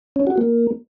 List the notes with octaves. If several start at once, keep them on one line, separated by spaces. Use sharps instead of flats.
C#4
F#4
A#3